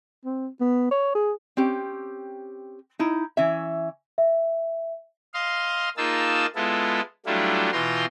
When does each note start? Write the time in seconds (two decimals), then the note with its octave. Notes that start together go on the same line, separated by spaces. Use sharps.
0.25 C4
0.61 B3
0.91 C#5
1.15 G#4
1.57 C4 C#4 G4
2.99 D#4 E4
3.37 E3 C#4 E5
4.18 E5
5.34 D#5 F5 C6
5.97 A#3 D#4 F4 G#4 A5 E6
6.56 G#3 B3 E4 F4 A4
7.26 F#3 G3 A3 D4 E4 F4
7.72 B2 E3 F4 G5 A#5 C6